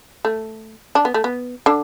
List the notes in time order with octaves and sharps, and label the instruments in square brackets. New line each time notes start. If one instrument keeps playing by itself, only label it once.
[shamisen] A3
D4
B3
A3
B3
D3 D4